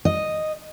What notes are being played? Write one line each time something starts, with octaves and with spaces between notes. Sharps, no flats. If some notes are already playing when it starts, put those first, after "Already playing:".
D#5